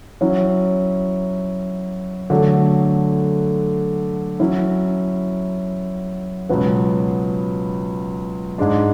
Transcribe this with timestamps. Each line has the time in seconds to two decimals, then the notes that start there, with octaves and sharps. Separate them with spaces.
0.21 F#3 C#4 E4
2.30 D3 F#3 A3
4.40 F#3 C#4 E4
6.50 C#2 B2 F#3 B3
8.58 G#2 G#3 D4